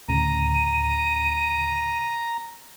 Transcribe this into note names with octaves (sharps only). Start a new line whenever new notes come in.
D2 A2 C#3 A#5 D#7